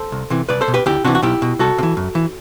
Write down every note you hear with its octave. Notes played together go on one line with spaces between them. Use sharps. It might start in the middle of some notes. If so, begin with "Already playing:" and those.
Already playing: A4 C5
C2
C3 E3
C2 B4 D5
A4 C5
B2
G4 B4
D2 E4 G4
C3 E3 D4 F#4
F#4
B1 E4 G4
B2
C2 F#4 A4
C3
E3
F#2
E3